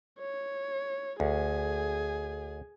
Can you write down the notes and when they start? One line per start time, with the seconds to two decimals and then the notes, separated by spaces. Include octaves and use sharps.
0.19 C#5
1.20 D2 G#4 G#5